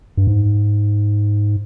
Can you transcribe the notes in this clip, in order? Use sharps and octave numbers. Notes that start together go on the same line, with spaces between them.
G2
G#2